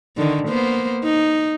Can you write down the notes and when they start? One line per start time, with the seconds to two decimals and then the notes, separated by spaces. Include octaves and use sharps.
0.17 D3 D#3
0.49 A#3 B3 C5
1.04 D#4